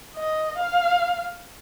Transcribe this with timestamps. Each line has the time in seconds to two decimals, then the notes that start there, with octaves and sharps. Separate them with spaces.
0.16 D#5
0.58 F5